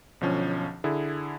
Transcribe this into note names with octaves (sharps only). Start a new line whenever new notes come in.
B1 D3 F3 C#4
D3 E4 G#4